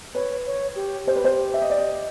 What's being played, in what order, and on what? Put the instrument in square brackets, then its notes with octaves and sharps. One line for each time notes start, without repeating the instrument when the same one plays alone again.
[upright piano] B4 [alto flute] C#5
[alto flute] C#5
G4
[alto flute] G4 [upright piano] C5
[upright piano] B4
C5
E5
D#5
D5
D#5